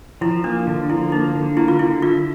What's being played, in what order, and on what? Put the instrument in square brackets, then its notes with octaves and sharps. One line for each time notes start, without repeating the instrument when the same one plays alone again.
[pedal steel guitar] F3 [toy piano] E4
[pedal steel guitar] A#3 [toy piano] D4
[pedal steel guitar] D3
[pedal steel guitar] F3 [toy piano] E4
[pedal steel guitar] A#3 [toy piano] D#4
[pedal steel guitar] D3
[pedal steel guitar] A#3 [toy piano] E4
[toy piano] F4
[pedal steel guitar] D3 [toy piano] E4
[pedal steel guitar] E4 [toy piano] F4